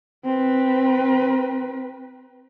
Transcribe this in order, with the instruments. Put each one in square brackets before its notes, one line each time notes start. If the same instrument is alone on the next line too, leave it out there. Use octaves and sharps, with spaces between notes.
[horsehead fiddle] C4 B4